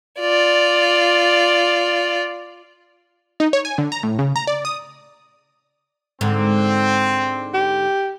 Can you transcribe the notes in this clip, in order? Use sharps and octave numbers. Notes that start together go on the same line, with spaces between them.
F4 D5
D#4
C#5
G#5
D3
A#5
A2
C#3
A#5
D5
D#6
G#2 D3 C4
G4